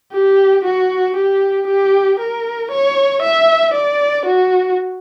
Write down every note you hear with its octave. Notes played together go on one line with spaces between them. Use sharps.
G4
F#4
G4
G4
A#4
C#5
E5
D5
F#4